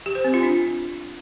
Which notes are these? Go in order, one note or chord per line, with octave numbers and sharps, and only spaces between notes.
G4
C5
C4
F4
D4